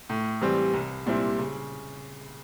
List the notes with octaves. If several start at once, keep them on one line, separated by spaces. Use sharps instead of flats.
A2
E3 G3 C4
C2
A#2 G3 C4 E4
C#3